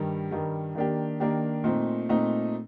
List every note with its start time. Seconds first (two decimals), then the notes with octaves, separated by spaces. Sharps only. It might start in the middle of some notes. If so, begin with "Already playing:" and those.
Already playing: G2 D#3 G3
0.31 G2 D#3 G3
0.75 D#3 A#3 D4 G4
1.20 D#3 A#3 D4 G4
1.64 A#2 A3 C4 D#4
2.09 A#2 A3 C4 D#4